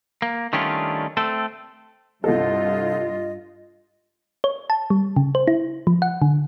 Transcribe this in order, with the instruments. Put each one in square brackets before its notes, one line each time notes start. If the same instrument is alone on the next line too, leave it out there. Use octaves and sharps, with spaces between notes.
[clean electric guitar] A#3
D#3 G3 A3 C#4 D4 F4
A3 C4 A4
[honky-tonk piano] C2 A4 [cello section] G2 F4 [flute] D#5
[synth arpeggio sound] C#5
A5
G3
C#3
C5
E4
F3
F#5
D3